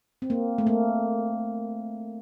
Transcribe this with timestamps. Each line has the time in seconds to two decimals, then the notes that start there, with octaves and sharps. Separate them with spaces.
0.22 C4
0.30 A#3
0.58 A3
0.67 A#3